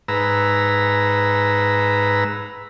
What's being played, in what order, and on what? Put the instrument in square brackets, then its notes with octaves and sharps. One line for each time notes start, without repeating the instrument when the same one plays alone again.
[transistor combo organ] G#2 B4 A#5 E6